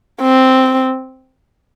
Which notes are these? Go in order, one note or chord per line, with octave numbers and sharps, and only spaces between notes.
C4